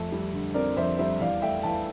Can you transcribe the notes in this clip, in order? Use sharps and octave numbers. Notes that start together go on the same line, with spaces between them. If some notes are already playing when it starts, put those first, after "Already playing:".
Already playing: F2 A3 A4
G3
D3
C4 A#4 D5
F2 C5 E5
G3 C5 E5
E2 D5 F5
A3 E5 G5
E3 F5 A5